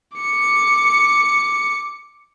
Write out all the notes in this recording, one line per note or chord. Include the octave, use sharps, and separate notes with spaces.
D6 C#7